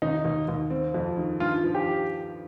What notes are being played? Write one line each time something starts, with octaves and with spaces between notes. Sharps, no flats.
D#2 D#4
D#2
D#2
C4
F2
D#3
G2 F4
F3
G4